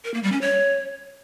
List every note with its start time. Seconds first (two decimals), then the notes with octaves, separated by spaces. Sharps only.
0.05 A#4
0.14 A#3
0.23 G3
0.32 C#4
0.41 C#5